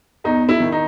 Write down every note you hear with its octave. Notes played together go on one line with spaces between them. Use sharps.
E2 D#4
E4
D#3
D#4